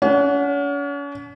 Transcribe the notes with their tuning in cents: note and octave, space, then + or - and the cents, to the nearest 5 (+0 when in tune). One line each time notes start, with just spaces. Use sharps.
C#4 +40 F#5 -10